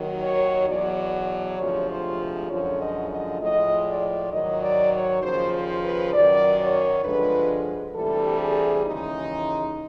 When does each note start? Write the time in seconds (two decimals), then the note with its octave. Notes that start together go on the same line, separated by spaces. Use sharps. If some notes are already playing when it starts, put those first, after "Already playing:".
Already playing: D#2 D#3 F#3
0.23 C#5
0.68 E2 B2 F#3 D5
1.13 D5
1.59 D2 C3 F3 G#3 C#5
1.90 C5
2.50 F#2 D3 F3 G#3 C#5
2.80 D#5
3.11 D#5
3.41 A2 F3 G#3 D#5
3.86 D5
4.32 G#2 D#3 F#3 D#5
4.62 D5
4.92 C#5
5.22 D#2 C#3 F3 C5
5.53 C5
5.84 B4
6.13 F#2 D#3 F#3 D5
6.59 C#5
7.04 G2 D3 F3 G#3 B4
7.95 D2 C3 E3 G3 A4
8.40 G#4
8.86 D#2 C#3 E3 G#3 D#4